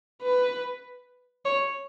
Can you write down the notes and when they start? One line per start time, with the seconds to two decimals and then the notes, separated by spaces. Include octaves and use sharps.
0.22 B4
1.45 C#5